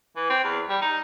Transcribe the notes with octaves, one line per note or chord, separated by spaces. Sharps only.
E3
C4
E2
G3
D#4